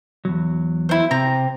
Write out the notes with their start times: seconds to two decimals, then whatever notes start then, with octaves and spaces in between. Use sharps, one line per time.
0.25 E2 G#2 F#3
0.89 E4 C5
1.11 C3 C4 A#5